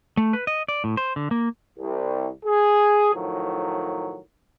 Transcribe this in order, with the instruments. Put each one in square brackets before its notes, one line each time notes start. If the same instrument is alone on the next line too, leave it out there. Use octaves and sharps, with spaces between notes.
[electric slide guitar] A3
B4
D#5
D5
A2
C5
D3
A#3
[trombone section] C2
G#4
A2 D#3 F3 F#3